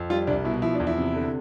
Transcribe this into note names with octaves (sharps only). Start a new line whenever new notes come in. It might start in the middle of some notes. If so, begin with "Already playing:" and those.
Already playing: F2
G3 F4
C2 D4
B2 E4
F3 E4
E2 D4
E4
C3
D3